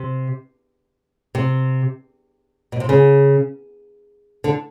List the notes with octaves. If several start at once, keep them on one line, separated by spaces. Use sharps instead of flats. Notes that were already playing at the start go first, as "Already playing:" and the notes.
Already playing: C3
C3
B2
C3
C#3
D3